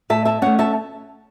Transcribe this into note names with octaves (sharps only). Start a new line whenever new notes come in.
A2 E5 A5
E5 A5
A3 C#4 C#5 F#5
E5 A5